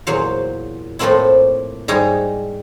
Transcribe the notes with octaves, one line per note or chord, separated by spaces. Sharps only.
E2 A#2 F#3 C5 F5
A2 F3 A3 A#3 C4 E4
G#2 G3 D#4 C#5 G#5 A#5